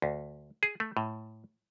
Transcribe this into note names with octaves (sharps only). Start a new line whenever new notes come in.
D2
G#4
A3
A2